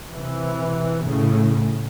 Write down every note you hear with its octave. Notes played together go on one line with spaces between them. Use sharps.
C3 E3
A2 C#3